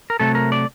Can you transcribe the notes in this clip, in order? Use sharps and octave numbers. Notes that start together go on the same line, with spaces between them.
A#4
C3 F#3 A3 A4
A#4
D5